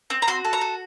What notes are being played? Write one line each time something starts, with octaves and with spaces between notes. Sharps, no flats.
C4
A#5
F#4 C6
A4
A#5
F#4